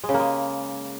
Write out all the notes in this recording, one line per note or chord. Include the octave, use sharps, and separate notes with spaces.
G#3
C#3
A#3
G#3